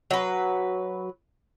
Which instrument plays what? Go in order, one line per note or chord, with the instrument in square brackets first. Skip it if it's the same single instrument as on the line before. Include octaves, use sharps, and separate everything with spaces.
[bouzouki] F#3 B4